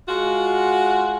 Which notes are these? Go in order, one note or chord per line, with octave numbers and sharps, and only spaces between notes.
G#3 F4 F#4